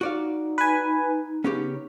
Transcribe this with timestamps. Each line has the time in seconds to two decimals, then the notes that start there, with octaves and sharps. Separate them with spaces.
0.01 D#4 F#4 D5 F5
0.58 B4 G#5
1.44 C#3 B3 C#4 G4